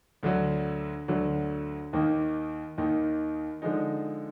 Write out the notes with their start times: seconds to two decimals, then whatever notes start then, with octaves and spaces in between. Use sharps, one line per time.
0.23 D2 D3 F#3
1.08 D2 D3 F#3
1.93 D#2 D#3 A#3 D#4
2.78 D#2 D#3 A#3 D#4
3.62 D3 F3 G#3 D#4